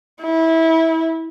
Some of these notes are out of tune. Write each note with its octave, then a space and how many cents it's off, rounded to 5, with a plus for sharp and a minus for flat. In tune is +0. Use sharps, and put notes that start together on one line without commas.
E4 -20